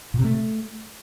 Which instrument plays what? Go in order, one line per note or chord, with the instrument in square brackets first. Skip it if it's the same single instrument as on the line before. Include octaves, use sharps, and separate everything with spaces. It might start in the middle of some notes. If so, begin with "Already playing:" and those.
[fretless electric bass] A#2
C3
A3